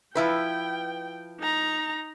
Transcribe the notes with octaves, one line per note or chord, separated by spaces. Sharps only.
F3 E4 B4 G5
D#4 A#5